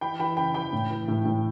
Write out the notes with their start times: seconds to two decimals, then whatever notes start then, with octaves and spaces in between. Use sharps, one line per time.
0.01 E3 G5 B5
0.19 E3 G5 B5
0.37 C#3 G5 B5
0.54 E3 G5 B5
0.73 A2
0.90 E3
1.08 A2
1.25 A2